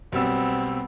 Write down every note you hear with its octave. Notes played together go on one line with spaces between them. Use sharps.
B1 G3 B3 C4 E6